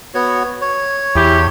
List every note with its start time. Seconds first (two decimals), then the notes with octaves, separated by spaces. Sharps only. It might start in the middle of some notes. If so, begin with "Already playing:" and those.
0.14 B3 F#4 C#5
0.61 C#5
1.16 E2 E4 G4